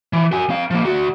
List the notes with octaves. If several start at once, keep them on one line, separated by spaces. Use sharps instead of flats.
E3
F#4 G#5
C4 F5
F3 A#3
D2 F#4